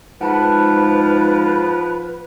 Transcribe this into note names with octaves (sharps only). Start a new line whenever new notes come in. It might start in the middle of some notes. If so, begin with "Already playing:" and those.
G#2 F3 B4 F#5 A5 B5